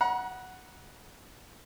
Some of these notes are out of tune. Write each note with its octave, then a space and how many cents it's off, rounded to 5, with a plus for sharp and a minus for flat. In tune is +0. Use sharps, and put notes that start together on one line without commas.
F#5 +0 A#5 +40